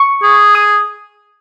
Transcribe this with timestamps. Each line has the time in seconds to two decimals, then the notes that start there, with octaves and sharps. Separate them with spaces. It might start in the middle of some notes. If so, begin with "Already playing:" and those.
Already playing: C#6
0.23 G#4
0.55 D#6